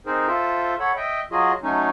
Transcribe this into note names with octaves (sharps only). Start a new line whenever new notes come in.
C4 D#4 G#4 A#4 C5
F4 A4 C5 E5
A4 C#5 F#5 B5
D#5 E5 G5
F#3 F4 F#4 G#4 D#5
F#3 A3 C#4 D#4